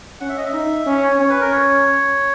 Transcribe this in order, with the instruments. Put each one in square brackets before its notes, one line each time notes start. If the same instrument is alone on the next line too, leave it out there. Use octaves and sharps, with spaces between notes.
[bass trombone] C#4 [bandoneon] F#5
[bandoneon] E5
D#5
E5
[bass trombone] D#4
C#4
[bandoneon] C#5
[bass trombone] C#4 [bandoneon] C#5
[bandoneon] B4
A#4
C#5